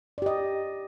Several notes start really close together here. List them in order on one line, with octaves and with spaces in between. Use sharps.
D5 G4 D#5